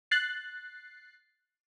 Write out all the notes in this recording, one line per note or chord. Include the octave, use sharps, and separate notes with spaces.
F#6 A6 C7